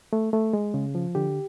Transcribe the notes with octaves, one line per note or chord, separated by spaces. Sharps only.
A3
A3
G#3
C#3
F3
D3 G4